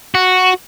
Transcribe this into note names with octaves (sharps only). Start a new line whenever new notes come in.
F#4